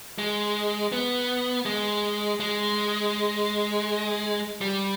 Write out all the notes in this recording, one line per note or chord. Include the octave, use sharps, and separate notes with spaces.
G#3
B3
G#3
G#3
G3